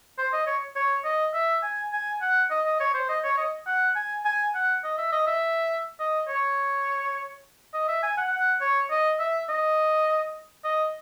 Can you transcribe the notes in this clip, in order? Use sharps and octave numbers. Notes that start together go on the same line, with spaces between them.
C5
D#5
C#5
C#5
D#5
E5
G#5
G#5
F#5
D#5
D#5
C#5
C5
D#5
C#5
D#5
F#5
G#5
G#5
F#5
D#5
E5
D#5
E5
D#5
C#5
D#5
E5
G#5
F#5
F#5
C#5
D#5
E5
D#5
D#5